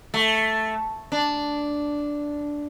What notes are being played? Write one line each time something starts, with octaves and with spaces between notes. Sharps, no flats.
A3
D4